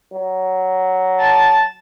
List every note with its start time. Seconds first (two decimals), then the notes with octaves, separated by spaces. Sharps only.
0.12 F#3
1.18 A5